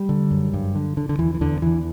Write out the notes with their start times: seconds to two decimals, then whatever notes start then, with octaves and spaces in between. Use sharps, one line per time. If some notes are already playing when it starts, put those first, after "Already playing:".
Already playing: G3
0.09 D3
0.31 F#2
0.54 G2
0.75 D3
0.97 D3
1.09 D3
1.18 E2 E3
1.34 E3
1.41 E2 D3
1.62 E2 E3